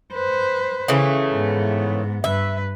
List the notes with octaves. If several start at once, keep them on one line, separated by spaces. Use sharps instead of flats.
B4 C5
C#3 E3 A3
G#2 B3
G2 B4 E5